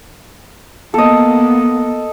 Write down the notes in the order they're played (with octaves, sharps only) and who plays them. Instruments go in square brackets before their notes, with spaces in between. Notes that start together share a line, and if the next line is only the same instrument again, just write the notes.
[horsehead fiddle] A#3 B3 [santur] A4 D#5